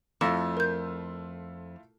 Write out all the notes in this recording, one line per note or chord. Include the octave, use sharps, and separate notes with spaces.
F2 A3 E4 F4 E7
A#4 G6